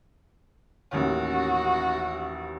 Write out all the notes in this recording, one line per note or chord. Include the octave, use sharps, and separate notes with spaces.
A1 D#2 C#4 F#4